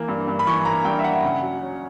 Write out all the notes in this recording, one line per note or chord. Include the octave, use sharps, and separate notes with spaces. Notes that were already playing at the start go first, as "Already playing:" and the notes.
Already playing: E3 A#3
G2
G2
B5
E3 C#6
A#3 A#5
G2 G5
E5
G2 F#5
C#3
F#3
C#4